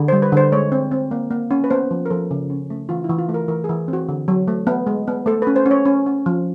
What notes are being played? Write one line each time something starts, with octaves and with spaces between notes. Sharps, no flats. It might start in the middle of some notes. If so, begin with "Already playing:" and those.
Already playing: D3
G3 C5
B4
D3 C5
G#3 C#5
C4
C4
A#3
A#3
C#4
B4
B3 C5
F3
A#4
F3 A4
C#3
C#4
A3
E3 F4
E4
E3
F4
A3
A#4
E3 A#4
G#4
E3
C4
F#4
D3
F#3
A3
B3
G#3
B3
A3 A4
C#4 B4
C5
C#4
C#5
C#4
C#4
F3